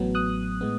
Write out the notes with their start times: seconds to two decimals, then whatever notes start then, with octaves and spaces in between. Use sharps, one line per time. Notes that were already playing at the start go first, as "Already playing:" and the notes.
Already playing: A1 A2 F#3 B3
0.15 D#6 F#6
0.61 A2 G#3 B3